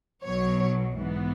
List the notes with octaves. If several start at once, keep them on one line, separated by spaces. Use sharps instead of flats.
B1 B2 F#3 C#5
G#2 E3 B3